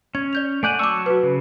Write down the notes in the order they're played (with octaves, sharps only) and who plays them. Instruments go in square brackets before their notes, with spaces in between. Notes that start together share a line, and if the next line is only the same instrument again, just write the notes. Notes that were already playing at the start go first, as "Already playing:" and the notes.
[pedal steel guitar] C#4 [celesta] G#6
[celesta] D5 G6 F7
[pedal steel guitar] A3 D5 F#5 [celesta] G#5 G6 D#7
[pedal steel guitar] F#3 A5 C#6 [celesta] D6 E6
[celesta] F#4 B4
[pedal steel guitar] C#3